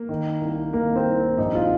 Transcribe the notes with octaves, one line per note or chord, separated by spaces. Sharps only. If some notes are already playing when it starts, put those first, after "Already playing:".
Already playing: A#3
D#3
C2
D#3 A#3
C4
C2
A#1 D#4
F4